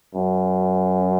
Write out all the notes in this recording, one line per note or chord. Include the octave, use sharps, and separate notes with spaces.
F#2